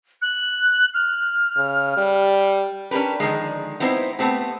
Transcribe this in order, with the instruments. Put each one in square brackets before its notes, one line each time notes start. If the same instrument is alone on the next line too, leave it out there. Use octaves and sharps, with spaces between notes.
[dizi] F#6
F6
[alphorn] C#3
G3
[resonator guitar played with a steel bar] C#4 D4 G4 A#4 B4
D3 D#3 F3 G#3
B3 C4 D#4 E4 A#4 C5
A3 B3 C4 G4